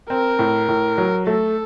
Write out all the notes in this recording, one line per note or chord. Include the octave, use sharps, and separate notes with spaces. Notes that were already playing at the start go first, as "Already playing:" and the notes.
C4 A#4
A2
A2
F#3
A3 A4